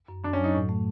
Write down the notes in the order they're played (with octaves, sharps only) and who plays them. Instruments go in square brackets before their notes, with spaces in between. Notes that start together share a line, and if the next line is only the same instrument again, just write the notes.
[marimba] F#2
[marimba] F#2 [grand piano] D4
[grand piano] C#4
[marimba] F#3
[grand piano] D#4
[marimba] A2
A3